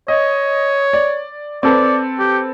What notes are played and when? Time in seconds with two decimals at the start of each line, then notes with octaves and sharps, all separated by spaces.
0.08 C#5 D#5
0.93 D5
1.63 C4 A4 B4 D5
2.19 G4